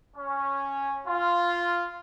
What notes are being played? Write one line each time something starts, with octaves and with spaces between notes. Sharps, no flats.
C#4
F4